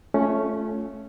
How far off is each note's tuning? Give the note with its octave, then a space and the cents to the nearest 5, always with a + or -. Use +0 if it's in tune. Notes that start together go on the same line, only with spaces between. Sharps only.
A3 -15 C#4 +0 F4 +0